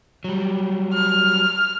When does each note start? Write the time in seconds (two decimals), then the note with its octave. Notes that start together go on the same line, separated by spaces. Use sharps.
0.24 F#3 G3
0.94 F6